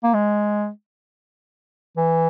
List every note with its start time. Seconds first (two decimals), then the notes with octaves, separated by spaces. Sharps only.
0.03 A#3
0.14 G#3
1.97 E3